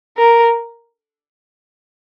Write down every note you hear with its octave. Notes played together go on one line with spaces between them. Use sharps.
A#4